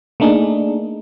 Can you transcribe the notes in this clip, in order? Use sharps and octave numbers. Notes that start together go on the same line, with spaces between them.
A3 A#3 D4 D#4 G#4